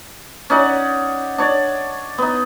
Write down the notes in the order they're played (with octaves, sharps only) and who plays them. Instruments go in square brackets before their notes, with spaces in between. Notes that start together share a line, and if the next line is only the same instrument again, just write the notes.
[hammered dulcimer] C#4 D#4 D5 F#5
D4 C#5 D5
B3 D#4